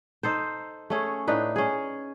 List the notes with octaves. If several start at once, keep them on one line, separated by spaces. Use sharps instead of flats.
D#4 A4 C5
A3 C#4 G#4
A2 D4 D#4 B4
C#4 G#4